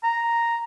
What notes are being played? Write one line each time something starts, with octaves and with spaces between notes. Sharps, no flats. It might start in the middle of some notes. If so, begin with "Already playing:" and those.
A#5